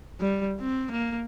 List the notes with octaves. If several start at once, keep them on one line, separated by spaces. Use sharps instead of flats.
G3
C4
A#3